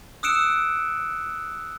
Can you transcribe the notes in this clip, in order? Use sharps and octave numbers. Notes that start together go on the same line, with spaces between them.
D#6 E6 F#6 C#7 D7 E7